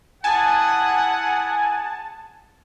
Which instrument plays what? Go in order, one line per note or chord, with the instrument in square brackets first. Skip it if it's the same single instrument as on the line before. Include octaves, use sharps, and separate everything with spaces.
[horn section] E4 G#4 F#5 [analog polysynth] G#5 [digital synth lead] A5